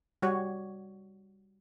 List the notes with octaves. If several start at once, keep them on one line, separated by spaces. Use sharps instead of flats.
G3 F#4 C#5